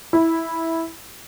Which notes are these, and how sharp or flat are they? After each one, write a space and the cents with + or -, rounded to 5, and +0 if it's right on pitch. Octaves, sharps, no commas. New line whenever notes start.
E4 -10